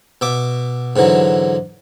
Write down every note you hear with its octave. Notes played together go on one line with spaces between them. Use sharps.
B2 E5 D6
G#2 D3 E3 F#3